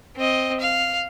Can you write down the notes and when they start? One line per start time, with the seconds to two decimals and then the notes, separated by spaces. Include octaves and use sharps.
0.16 C4 D#5
0.61 F5